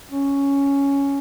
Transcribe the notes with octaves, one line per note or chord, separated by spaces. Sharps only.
C#4